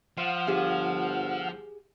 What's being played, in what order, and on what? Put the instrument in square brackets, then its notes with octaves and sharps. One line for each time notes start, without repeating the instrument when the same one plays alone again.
[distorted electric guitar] F3 [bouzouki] F5 [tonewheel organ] F#5 E6 F6
[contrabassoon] G1 [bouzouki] G4 G#4 F5